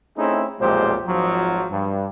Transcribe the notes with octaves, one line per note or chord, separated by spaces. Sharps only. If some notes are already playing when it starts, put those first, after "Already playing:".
A3 C4 C#4 D#4 E4 G#4
B1 F2 A#2 G#3 G4 C5
G#1 F3 F#3
G2